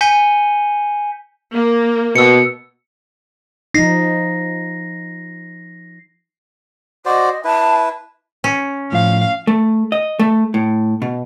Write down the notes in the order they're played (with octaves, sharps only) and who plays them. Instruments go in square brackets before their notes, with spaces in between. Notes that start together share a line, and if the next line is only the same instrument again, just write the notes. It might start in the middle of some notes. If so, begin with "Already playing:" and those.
[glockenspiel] G#5 G6 B6 C#7 D#7 G7
[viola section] A#3
[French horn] B2 [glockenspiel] E6 C#7
[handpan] F3 D#4 [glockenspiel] A#6 C7
[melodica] F#4 C5 D5 [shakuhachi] D#5
[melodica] E4 B4 [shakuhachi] A5
[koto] C#4
[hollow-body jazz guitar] A2 F3 [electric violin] F5
[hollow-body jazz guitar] A3
D#5
A3
A2
B2